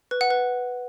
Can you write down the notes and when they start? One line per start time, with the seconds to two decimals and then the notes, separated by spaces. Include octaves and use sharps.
0.11 B4
0.21 F#5
0.30 B4